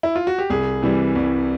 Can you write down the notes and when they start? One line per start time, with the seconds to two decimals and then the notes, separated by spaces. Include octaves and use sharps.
0.03 E4
0.16 F4
0.27 F#4
0.38 G4
0.50 C2 G#4
0.83 C3 E3 G3
1.15 C2